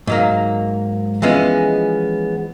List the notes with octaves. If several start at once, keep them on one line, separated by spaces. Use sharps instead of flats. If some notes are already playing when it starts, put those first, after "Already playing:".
G#2 F#3 A#3
E3 F3 G#3 B3 C#4